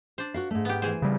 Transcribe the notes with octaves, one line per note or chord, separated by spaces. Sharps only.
D4 C5
F#4 A#4 F5
G#2 A3
B3 G4
E3 G#4 C5
C#3 G3